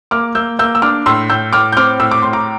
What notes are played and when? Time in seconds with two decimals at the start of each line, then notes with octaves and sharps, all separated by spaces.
0.11 A#3 D6 F6
0.35 A#3 E6 G6
0.59 A#3 E6 G6
0.75 E6
0.82 D4 D6 F6
1.06 A2 C6 E6
1.30 A2 E6 G6
1.53 A2 D6 F6
1.72 G6
1.77 C4 D6 F6
2.00 A2 E6
2.11 D6
2.22 A2 C6
2.33 A#5 D6